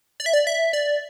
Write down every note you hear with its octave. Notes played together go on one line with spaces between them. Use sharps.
D5
E5
D5
E5
D5